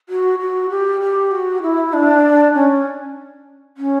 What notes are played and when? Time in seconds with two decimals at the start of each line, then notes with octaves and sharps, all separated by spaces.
0.09 F#4
0.39 F#4
0.70 G4
1.01 G4
1.31 F#4
1.62 E4
1.93 D4
2.54 C#4
3.77 C#4